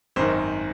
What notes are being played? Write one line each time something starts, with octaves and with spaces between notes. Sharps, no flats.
G#1 F#2 D#3 C5